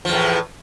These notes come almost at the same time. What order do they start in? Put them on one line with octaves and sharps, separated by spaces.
F3 E2 A2